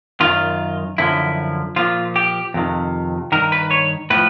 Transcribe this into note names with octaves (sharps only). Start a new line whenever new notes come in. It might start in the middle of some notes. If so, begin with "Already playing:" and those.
F#2 D#3 F4
F#2 D3 F3 E4
A#2 F3 F4
G4
F2 C3 D#3
G2 D#3 A#4
B4
C#5
A2 F3 B4